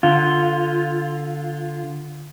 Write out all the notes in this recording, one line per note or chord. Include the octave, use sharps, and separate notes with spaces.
D3 F4